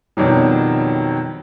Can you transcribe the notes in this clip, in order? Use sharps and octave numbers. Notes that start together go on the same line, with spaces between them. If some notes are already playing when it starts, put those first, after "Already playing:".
F2 B2 D#3 F#3 G3